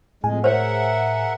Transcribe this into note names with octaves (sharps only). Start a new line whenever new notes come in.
F2 A2 G#3 G#4 G#5
A#4 C5 C#5 E5 F#5